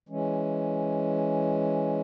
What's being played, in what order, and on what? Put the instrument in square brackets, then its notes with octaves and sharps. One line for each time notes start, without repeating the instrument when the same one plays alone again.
[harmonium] E3 G#3 C#4